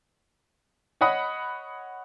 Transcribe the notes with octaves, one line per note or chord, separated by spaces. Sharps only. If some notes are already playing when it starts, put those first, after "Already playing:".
C#5 D#5 F#5 B5 D#6